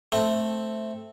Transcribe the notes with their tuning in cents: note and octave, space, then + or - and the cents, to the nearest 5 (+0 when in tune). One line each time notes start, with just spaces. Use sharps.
A3 +0 C4 +0